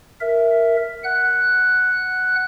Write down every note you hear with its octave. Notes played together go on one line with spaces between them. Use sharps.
A#4 E5
F#5 F#6